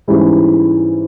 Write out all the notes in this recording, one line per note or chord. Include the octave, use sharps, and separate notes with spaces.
G#2 E3 G3 C#4 E4